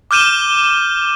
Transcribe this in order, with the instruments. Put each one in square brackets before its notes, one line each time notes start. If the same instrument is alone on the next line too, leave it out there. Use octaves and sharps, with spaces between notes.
[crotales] D6 F6 G6 D#7 E7 G7